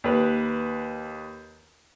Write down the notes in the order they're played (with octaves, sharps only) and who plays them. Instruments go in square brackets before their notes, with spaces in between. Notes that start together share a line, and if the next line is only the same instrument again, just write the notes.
[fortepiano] D#2 B4